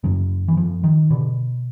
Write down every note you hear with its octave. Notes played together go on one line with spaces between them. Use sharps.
F#2 C#3 F#3
E3
F3
D#3
B2 D3